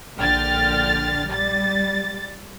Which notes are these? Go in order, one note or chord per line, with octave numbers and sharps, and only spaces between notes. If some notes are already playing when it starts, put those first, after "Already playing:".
A#1 D3 G5 F6 A6
G3 A6